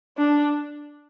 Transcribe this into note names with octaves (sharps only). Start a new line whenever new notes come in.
D4